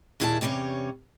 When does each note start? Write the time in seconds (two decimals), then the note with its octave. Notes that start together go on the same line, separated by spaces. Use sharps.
0.20 D#2 A#2 E4 G#4 A4 A5
0.41 E2 C3 G3 C#4 C#5